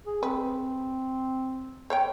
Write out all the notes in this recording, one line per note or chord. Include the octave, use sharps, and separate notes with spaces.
G#4
C4 B4
C5 C#5 G5